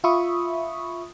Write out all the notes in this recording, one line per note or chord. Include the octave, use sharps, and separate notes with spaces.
F4 E5 B5 C#6 D#6